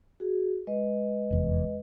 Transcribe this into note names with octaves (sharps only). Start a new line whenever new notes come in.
F#4 G#4
G#3 B4 D#5
F1 E2